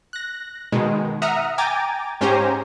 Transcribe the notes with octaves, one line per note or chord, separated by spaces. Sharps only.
F#6 A#6
B2 D#3 G#3
E5 F#5 A#5 D#6 F6
G5 G#5 A#5 D6 A6
G#2 C#4 G4 C5 G#5 A#5